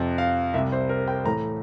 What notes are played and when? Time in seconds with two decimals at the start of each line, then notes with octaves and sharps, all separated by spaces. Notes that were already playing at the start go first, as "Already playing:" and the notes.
Already playing: F2 C3 F3
0.18 F5
0.54 C2 C3 G3 E5
0.72 C5
0.89 A#4
1.08 G5
1.26 A2 E3 A3 A#5